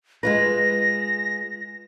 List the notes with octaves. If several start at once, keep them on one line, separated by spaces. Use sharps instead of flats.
G#3 F4 B4 A#6